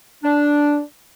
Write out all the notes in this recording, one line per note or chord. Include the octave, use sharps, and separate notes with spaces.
D4